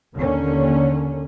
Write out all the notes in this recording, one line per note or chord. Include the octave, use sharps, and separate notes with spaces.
D#2 D3 A#3 C#4